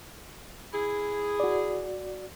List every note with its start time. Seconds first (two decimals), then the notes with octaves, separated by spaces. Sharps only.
0.73 E4 G#4
1.40 F#4 D5